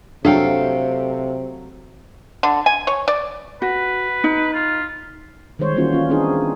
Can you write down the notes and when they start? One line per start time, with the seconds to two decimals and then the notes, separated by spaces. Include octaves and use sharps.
0.25 C3 F#3 A3 D4 A4 F5 G5
2.43 D3
2.66 G#5
2.87 C#5
3.08 D5
3.62 F#4 B4
4.24 D#4
4.54 F4
5.59 D#3 G3 G#3 C5 C#5
5.75 E3 G3 A#3 C#4 F4 F#4
5.92 C#4 F4
6.10 C4 D4 D#4 G#4